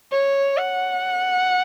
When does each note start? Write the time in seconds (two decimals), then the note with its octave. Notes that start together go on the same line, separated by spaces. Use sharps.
0.12 C#5
0.57 F#5